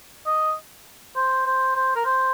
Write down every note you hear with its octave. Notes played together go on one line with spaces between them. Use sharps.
D#5
C5
C5
C5
A#4
C5